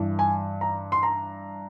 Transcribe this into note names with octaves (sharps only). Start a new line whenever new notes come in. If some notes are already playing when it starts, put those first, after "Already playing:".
Already playing: G2 E3
G#5
A#5
C6
A#5